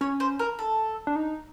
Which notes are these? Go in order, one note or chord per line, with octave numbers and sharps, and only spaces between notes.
C#4 C#5
C5
A#4
A4
D4
D#4